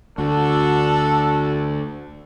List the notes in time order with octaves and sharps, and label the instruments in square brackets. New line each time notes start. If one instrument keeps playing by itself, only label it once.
[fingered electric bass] D2 [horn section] D4 F#4 A4